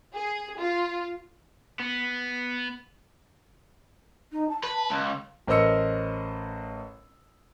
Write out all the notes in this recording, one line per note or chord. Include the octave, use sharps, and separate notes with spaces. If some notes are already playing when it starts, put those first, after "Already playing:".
G#4
F4
B3
D#4
A5
B4
C#2
A1 A#4 C5 D#5 E6 C#7